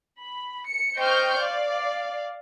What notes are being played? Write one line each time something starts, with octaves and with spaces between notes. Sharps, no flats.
B5
C#7
C5 D#5 G5 C#6 F6 G6
D5 F5